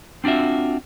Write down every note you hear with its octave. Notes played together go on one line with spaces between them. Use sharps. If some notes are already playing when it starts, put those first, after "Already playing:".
C4 D4 F4 F#4 E5